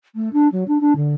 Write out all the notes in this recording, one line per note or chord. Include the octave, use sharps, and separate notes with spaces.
A3
D4
F#3
D4
D4
D3